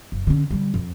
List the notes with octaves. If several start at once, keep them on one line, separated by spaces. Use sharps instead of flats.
F#1
D3 C#4
D3 G3
F2